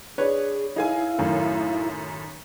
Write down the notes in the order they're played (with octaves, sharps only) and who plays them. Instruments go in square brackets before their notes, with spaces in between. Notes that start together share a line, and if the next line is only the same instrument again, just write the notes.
[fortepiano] D4 B4 C#5 [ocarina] G#4
[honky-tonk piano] D#4 G#4 G#5 [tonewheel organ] E4 [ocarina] F5
[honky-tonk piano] F#2 A2 D#3